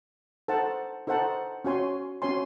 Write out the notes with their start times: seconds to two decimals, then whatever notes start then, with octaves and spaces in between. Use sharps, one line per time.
0.48 D#4 A4 C5 F#5 A5
1.07 D#4 A4 C5 F#5 A5
1.64 C#4 F#4 C#5 G#5 C6
2.22 C#4 F#4 C#5 G#5 C6